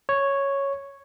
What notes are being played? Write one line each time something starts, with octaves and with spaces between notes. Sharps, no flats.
C#5